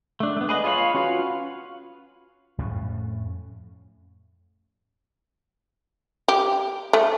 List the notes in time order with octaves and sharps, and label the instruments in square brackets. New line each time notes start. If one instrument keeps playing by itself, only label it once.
[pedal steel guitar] A3 D4
A3 B3
G#4 B4 D#5
F4 G#4 C#5 F5 B5
C#4 F4 F#4 B4 F5
[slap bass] F2 A2 A3 C#4
[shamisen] G4
A3